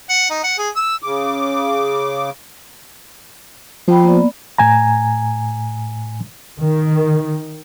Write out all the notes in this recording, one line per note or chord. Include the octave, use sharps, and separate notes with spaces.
F#5
D#4
F#5
G#4
E6
C#3 D6
F3 C5 G5 B5
A#3 B3 D5
A2 G#5 A#5
D#3